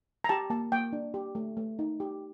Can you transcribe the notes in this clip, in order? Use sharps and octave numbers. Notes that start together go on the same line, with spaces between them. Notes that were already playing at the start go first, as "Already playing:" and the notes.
A#5
G4 A5
A#3 A5
A#3 G5
D4
G4
A3
A3
D#4
G4